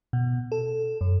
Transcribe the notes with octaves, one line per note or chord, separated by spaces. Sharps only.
B2
A4
F#2